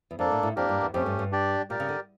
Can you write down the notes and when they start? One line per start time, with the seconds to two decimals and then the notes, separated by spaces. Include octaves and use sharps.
0.11 E2
0.19 F2 A#3 D4 A4
0.32 A2
0.43 A2
0.56 F2 A#3 D4 G4 A#4
0.69 G2
0.81 E2
0.94 F2 A3 C#4 G4
1.06 G2
1.19 G2
1.32 D4 G4 D5
1.70 A#2 G4 A#4 D5
1.80 C#3
1.89 D3